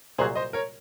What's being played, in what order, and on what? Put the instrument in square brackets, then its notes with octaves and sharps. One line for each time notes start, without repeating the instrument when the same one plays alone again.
[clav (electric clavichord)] C2 A#2 F#3 [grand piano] G#4 C5
[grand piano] C5 D#5
A#4 C#5